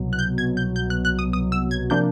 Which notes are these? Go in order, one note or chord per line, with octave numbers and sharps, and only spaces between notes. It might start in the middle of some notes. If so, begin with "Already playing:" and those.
Already playing: C2 B2 F#3
F#6
G6
G#6
G6
G6
F#6
F#6
D#6
D#6
E6
G#6
C3 F3 A#3 D4 G6